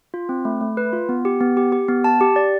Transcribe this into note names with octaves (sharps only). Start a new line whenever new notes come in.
F4
C4
A3
A3
B4
F4
B3
G4
B3
G4
G4
B3
A5
G4
D5